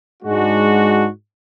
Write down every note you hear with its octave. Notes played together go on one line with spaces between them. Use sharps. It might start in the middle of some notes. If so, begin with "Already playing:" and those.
G#2 G#3 D4 F#4